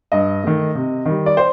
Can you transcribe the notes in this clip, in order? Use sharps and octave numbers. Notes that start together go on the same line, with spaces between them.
G2 D#5
D#3 A3
C3
D#3 G3
D5
C5